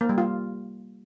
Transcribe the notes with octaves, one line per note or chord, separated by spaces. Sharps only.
A#3
G3
F4